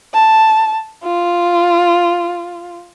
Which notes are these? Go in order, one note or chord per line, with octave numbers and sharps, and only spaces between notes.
A5
F4